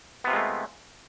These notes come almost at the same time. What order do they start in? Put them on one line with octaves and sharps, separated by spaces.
B3 C3 F4 G#3 A3